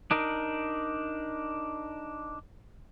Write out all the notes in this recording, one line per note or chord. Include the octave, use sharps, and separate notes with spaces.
D4 D#4 A#4